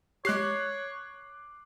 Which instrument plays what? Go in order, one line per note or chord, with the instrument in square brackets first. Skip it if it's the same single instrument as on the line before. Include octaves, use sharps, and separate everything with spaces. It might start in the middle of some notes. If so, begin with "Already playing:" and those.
[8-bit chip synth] G#3 G4 [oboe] C#5 [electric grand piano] D6 F#6 C7